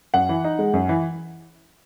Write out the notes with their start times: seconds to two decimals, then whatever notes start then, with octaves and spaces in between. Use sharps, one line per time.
0.14 F#2 F#5
0.29 E3
0.44 D#4
0.59 G#3
0.73 F#2
0.89 E3